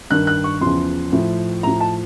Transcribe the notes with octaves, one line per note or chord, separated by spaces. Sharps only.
G2 D#3 F#6
F#6
C#6
E2 C#3 F3 C6
A2 F3
A2 F3 A#5
A5